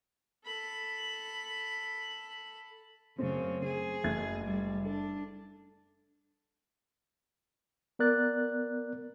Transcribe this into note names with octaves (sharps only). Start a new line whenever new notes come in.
A4 B5
F#2 C#3 A3 C4
G#4
F#1 A3 G#6
G3
D4 A4
B3 A#4 D5 F#6 A6